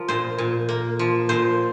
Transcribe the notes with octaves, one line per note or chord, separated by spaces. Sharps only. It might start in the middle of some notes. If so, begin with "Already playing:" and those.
Already playing: F3 A#4
A#2 C5
A#2
A#3
F3
A#2 C5